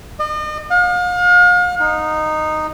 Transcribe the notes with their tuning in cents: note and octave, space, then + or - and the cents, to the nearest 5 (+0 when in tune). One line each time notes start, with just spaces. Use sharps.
D#5 -40
F5 +40
D#4 -10